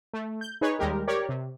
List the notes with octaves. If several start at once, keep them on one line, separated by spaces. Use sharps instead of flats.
A3
G6
D#4 G#4 B4 C#5
D#2 G3 G#3 G4 A#4
G4 A#4 C#5 D5
C3